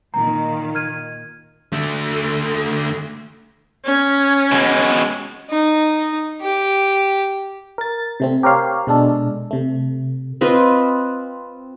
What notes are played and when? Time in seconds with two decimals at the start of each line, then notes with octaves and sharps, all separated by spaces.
0.14 A#2 D#3 A#5
0.75 F6 G#6 D#7
1.73 D3 A3
3.85 C#4
4.52 B2 G#3
5.50 D#4
6.41 G4
7.78 A#4 A6
8.20 C3 A3 C4
8.43 G4 A#4 C5 C#5 F5
8.87 B2 G#3 D4 A4
9.51 C3 A3
10.41 C4 F4 B4 D#5